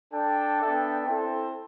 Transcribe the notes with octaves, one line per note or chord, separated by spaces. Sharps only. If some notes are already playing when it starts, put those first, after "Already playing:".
D4 A4 D5 G5
B3 D4 A4 E5 G5
C4 E4 A4 C5